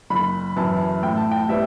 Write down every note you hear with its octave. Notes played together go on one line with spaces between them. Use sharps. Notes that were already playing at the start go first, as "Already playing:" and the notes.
F#1 B5
F#2 E3 A5
A2 G5
A5
G5
G3 B3 E5